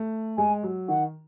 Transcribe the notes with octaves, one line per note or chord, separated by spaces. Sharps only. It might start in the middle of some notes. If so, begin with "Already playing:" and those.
Already playing: A3
G#3 G#5
F#3
D#3 F#5